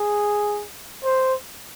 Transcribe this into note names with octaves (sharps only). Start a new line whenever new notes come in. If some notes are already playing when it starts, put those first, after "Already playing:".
Already playing: G#4
C5